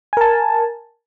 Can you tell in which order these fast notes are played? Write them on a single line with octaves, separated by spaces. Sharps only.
G#5 A#4 A5